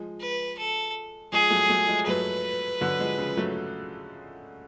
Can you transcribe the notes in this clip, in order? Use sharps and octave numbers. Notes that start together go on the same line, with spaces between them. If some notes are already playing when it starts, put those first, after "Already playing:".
Already playing: F3 G#3
B4
A4
F3 G#3 G#4
F#3 A3
F#3 A3
F3 G#3
F#3 A3 B4
D3 F#3
F3 G#3
C#3 F3
F#3 A3